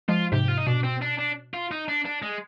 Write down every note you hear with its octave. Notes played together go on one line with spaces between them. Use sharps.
F3 G#3 F4
G#2 C3 G4
F4
D#4
B2 D4
C4
D4
D4
F4
D#4
D4
D4
G#3